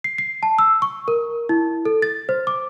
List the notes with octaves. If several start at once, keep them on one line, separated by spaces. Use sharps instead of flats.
C7
C7
A5
E6
C#6
A#4
E4
A4
A6
C5
D6